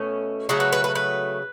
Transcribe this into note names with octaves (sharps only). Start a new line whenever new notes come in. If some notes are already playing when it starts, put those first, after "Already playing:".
Already playing: B2 A3 C#4
C#3 F#3 A3 F#4
B4
B4
B4
B4